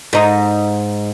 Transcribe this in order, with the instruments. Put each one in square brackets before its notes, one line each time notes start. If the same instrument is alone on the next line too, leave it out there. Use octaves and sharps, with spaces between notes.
[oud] G#2 D#4